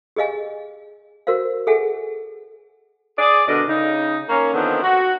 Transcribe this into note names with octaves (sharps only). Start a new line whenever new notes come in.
G4 G#4 D#5 F5 G#5
F#4 A#4 C5 F5
G#4 A4 E5 F#5 G#5
G#4 D5
B2 D3 A#4 D5 D#5
C#3 D#4
A#3 C#4
D3 D#3 F3 B3 C4
F#4